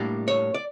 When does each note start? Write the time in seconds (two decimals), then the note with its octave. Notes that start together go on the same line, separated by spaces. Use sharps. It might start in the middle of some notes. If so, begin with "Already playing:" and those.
Already playing: A2 G3 A#3 D4
0.28 C#5
0.54 D5